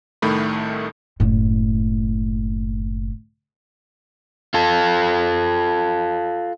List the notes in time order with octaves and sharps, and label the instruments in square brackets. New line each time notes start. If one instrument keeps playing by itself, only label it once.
[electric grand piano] C2 A2 D#3 A3 B5
[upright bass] F#1 A2
[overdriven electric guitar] F4 A4